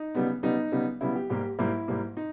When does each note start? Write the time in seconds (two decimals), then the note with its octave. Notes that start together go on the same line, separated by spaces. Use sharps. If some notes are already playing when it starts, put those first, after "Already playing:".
Already playing: D#4
0.15 C#3 G3 B3
0.43 C#3 G3 B3 D#4
0.72 C#3 G3 B3
1.01 C#3 G3 B3 E4
1.15 G4
1.30 G#2 G3 A#3 G4
1.59 G#2 G3 A#3 E4
1.88 G#2 G3 A#3
2.17 D#4